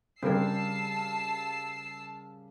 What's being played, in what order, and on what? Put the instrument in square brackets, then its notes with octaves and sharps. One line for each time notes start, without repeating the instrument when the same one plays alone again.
[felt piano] C#3 G3 A#4 [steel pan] C4 D4 [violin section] A5 E6 C7